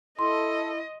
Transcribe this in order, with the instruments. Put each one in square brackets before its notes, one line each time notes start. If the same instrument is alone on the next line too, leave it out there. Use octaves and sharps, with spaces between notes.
[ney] E4 [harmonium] A4 [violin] D#5 [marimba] C6